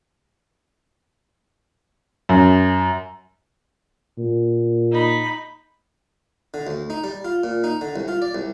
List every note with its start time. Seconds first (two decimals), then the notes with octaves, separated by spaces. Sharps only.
2.29 F#2
4.18 A#2
4.91 D#4 B5
6.54 D3
6.67 D2
6.90 D#4
7.04 G3
7.25 F4
7.44 A#2
7.64 D#4
7.81 D3
7.96 C2
8.08 F4
8.22 D5
8.35 C2